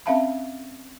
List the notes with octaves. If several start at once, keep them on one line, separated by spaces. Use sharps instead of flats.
C4 C#4 E5 F5 A5 B5